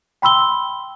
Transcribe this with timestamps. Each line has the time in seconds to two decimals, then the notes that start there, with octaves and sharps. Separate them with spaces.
0.22 G5 B5 C6 E6 G7